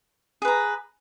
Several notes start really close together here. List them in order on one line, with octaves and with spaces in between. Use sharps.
G#4 B4 A#5